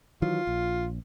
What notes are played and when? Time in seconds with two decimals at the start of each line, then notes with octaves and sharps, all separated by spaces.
0.22 D#3 E3 F#3 F4
0.47 A#1